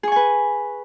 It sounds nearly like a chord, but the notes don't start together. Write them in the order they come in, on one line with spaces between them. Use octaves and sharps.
G#4 C#6 G#5 B4